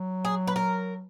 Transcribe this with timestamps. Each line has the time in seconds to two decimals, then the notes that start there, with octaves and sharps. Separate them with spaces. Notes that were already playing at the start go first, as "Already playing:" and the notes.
Already playing: F#3
0.25 G#4
0.47 B4
0.56 A#4